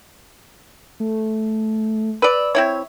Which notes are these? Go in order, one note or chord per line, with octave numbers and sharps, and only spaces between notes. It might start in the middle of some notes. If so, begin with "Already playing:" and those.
A3
B4 D5 E6
C4 E4 C#5 E5